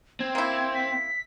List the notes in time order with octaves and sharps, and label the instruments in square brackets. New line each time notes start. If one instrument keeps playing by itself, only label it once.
[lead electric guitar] C4 [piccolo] G#6
[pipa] A#3 E4
[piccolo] B6